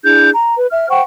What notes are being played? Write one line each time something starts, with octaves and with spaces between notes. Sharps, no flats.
D4 E4 G#4 G6
A#5
B4
E5 F6
C5 F#5 G5 C#6